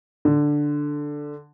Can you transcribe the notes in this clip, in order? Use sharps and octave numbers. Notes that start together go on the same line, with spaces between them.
D3